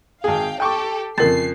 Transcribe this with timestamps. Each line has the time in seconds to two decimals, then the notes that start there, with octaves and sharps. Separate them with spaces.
0.24 G#1 G#4 F5 G5
0.60 G4 A4 G5 C#6 D6
1.18 F2 C#3 A#4 A6 C7